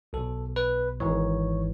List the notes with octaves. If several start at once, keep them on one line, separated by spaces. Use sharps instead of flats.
B1 B2 A4
B4
G#1 G#2 E3 C#5